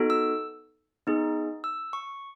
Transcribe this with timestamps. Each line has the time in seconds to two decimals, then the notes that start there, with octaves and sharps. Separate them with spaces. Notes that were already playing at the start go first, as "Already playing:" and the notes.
Already playing: B3 D#4 F#4 A4
0.10 E6
1.07 B3 D#4 G#4
1.64 E6
1.93 C#6